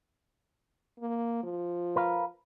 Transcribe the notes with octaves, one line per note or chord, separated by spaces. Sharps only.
A#3
F3
A#4 B4 F5